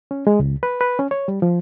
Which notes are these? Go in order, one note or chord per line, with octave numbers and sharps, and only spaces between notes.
C#4
G#3
C#2
B4
B4
C#4
C#5
G3
F3